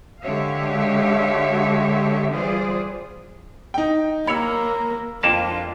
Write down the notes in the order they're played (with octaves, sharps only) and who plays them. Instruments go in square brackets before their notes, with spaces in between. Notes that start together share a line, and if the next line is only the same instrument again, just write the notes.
[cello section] D3 G#3 G4 C#5 E5 F5
E3 G3 F4 G#4 C5 D5
[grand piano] D#4 G5
[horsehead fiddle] A#3 A#4 [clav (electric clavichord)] C#5 [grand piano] B5 E6
[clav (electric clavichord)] F2 A#3 A5 [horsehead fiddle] D4 F4